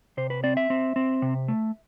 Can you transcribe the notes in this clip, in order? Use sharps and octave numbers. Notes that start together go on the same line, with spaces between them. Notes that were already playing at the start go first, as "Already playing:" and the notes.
C3 C5
B4
C4 D5
E5
C4
C4
C3
A3